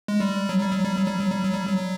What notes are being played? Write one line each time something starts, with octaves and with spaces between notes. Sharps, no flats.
G#3
G3
F#3
G3
F#3
G3
F#3
G3
F#3
G3
F#3
G3
F#3